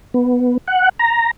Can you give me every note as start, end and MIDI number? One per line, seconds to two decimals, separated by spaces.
0.14 0.57 59
0.68 0.89 78
0.99 1.31 82